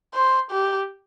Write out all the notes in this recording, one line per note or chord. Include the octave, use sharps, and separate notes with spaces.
C5
G4